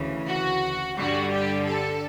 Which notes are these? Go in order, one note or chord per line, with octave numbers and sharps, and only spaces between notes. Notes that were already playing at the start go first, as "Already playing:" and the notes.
Already playing: D2 C#3 E3
F#4
G2 D3 G3 F#4
G4
A4